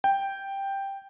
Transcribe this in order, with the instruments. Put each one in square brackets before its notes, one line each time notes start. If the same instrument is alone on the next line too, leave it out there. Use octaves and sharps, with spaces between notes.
[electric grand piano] G5